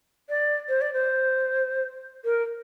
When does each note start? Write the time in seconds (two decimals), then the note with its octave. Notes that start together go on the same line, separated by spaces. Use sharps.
0.29 D5
0.69 C5
0.81 D5
0.93 C5
2.25 A#4